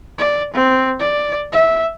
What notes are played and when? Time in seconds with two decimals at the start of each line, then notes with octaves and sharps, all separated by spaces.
0.18 D5
0.54 C4
1.00 D5
1.52 E5